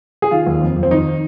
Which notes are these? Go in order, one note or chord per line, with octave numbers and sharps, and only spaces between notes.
G#4
D#3 F4
D#2
F2
F2
C4
D#3 D#4